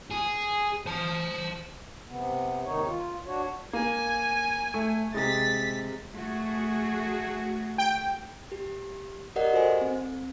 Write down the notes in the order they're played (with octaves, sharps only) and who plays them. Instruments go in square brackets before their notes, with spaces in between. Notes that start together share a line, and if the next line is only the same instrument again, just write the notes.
[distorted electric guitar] G#4
C5 A5
[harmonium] C3 B3
D#2 G#2 C3 D#3 D#4 C#5
F4
D4 F#4 C#5
[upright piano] A#3 [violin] G#5
[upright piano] A3
[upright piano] C3 G#3 [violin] A6 B6
[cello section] A3 F#4 G#4
[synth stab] G5
[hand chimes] G4
G4 A#4 D5 D#5 F#5
F#4 A4 C5 G#5
C4